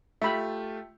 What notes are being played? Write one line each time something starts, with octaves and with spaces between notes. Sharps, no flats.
A3 F4 G4 E5 B5